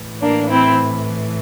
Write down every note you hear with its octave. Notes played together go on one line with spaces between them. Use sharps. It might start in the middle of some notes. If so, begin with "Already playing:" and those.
Already playing: A2 E3
A#3 D4
C4 E4